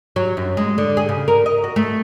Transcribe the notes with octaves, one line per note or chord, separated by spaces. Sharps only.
F#3
F#2
G#3
D3
G#4
C#3
A#4
D#5
F#4
A3